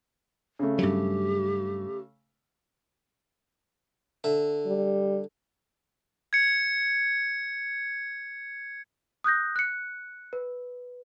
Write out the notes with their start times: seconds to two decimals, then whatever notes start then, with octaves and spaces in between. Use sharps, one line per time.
0.59 C#3 A3
0.79 G2 F#3 G4
4.24 D3 E5
4.66 G3
6.33 G#6 C#7
9.24 D#6 F#6 G6 A#6
9.56 F#6 C#7
10.33 B4